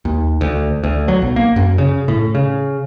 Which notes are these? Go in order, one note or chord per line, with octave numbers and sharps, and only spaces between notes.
D#2
D2
D2
F#3
B1
A#3
F#2
C#3
A2
C#3